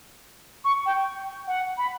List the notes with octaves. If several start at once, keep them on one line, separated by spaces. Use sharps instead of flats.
C#6
G5
F#5
B5